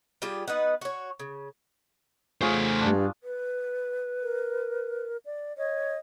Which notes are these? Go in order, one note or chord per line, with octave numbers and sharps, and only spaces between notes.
G3 F4 G4 G#4
B3 D#4 B4 F#5
F#4 C#5
C#3
A3 F4 G#4 C5 C#5
G2 D4
B4
A#4
D5
C#5 D#5